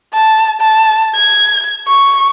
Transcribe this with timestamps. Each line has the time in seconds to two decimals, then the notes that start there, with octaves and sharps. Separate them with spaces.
0.14 A5
0.61 A5
1.15 G#6
1.88 C#6